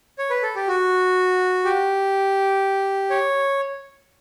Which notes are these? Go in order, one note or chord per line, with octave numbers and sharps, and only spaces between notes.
C#5
B4
A4
G4
F#4
G4
C#5